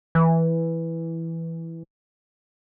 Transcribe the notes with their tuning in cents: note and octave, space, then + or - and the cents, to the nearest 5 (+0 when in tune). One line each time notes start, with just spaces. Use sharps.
E3 +0